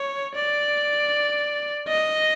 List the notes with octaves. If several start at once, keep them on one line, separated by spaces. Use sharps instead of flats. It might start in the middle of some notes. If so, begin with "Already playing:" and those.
Already playing: C#5
D5
D#5